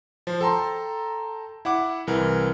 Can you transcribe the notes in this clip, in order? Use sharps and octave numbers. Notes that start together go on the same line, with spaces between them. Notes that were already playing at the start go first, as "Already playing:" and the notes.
F3 C5
A4 G5 A5 A#5 C6
E4 F#5 D6
C2 E3 A#4 A#5